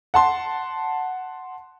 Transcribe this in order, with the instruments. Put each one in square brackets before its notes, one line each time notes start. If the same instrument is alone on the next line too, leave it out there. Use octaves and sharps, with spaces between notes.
[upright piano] F#5 A5 C6